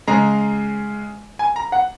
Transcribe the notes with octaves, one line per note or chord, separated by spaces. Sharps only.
C#3 G#3 A#5
G#5
A#5
F#5